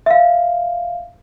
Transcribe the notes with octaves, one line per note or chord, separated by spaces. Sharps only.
E5 F5